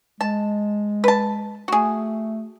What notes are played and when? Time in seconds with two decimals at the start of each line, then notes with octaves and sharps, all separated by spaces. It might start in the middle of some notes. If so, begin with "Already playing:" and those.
0.21 G#3 A5
1.04 B4 A5
1.68 A3 F#4 G#4